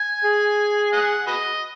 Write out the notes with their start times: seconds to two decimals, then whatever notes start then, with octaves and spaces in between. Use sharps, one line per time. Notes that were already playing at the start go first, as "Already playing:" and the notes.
Already playing: G#5
0.24 G#4
0.93 D#5 F#5
1.27 F#4 B4 D#5